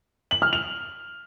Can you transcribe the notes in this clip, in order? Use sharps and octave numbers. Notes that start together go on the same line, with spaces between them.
F#7
F6
F7